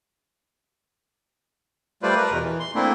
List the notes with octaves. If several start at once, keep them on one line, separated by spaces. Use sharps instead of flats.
G3 A3 F4 B4 C5 D5
A#4 B4
E2 B2
E3
C6
A3 A#3 C4 D4 E4